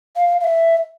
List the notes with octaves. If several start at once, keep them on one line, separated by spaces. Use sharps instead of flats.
F5
F5
E5